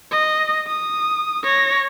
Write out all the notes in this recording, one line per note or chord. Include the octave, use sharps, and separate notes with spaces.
D#5
D#6
C#5 A#6